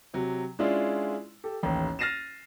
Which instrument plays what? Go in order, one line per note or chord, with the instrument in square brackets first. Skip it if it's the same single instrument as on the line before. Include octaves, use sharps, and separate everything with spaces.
[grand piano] C3 F#3
G#3 C#4 D4 E4 F4 G#4
G4 A4
A1 D#2
F6 A6 A#6 C7 D#7 E7